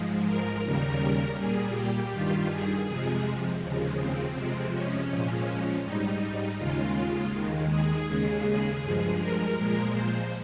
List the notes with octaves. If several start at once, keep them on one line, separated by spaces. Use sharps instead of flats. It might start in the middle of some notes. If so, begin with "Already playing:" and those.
Already playing: G#2 F3 G#3
A#4
D#2 C#3 G3
A#2 G3 G#4
G4
G2 D#3 G3 F4
G#4
F2 C3 F3 G#3 G#4
D#2 C#3 F3 G#3
C4
F2 C3 F3 G#3
C#4
A#2 F3 G#3
G#2 G3 D#4
D#2 C#3 G#3 F4
D#2 D#3 G#3
G#4
D#2 C#3 G#3
G2 F3 G#3
A#4
A#2 F3 G#3
C5